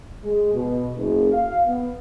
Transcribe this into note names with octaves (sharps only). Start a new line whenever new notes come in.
G#3
B2
F#1
F5
B3